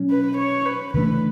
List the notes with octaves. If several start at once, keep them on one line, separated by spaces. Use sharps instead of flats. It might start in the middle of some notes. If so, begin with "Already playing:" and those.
Already playing: B2 F#3 C#4
B4
C#5
B4
C#3 E3 A3 D4 B4